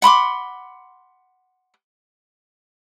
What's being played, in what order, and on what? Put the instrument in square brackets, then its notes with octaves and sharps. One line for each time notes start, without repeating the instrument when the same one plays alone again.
[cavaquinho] F#5 B5 C6 D6